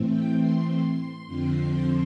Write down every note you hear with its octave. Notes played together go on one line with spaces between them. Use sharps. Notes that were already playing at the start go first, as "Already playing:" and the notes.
Already playing: A2 E3 A3 C4
G5
C6
C6
F2 D3 F3 C4